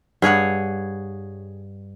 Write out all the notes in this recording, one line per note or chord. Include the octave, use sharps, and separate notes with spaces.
G2 G#4 C#5 F#5